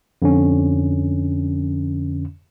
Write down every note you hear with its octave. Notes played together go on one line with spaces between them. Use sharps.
F2 D3 C#4